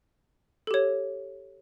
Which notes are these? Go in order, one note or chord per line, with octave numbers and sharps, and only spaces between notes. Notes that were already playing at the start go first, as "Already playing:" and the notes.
G4 A4 C#5